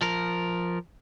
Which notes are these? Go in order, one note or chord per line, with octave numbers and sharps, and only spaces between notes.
F3 A#4